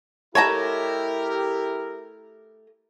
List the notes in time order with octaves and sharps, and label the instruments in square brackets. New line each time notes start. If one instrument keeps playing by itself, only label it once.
[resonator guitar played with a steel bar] A3 D#5 A5 [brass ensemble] E4 G4 A#4 [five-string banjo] C#5 A#5